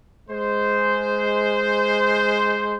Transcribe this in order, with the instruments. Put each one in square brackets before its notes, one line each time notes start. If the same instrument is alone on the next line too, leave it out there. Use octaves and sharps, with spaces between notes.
[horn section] G#3 C5